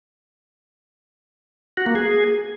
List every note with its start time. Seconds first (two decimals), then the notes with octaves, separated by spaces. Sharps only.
1.77 F#4
1.86 A#3
1.95 G#4